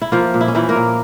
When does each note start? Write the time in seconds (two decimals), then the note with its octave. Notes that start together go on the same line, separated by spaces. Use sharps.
0.02 E4
0.12 F3 A#3 F4
0.34 A#2
0.41 E4
0.48 C#4
0.55 E3 F3 E4
0.69 A#3 A#4
0.76 A#2